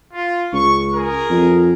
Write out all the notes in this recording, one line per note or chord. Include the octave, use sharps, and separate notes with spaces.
F4
C#2 C#6
G#4 A#4
F2